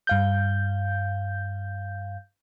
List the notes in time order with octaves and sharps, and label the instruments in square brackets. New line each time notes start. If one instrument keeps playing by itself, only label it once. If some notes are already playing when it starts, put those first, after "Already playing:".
[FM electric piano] G2 F5 G6